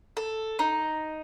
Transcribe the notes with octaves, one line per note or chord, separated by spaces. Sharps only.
A4
D#4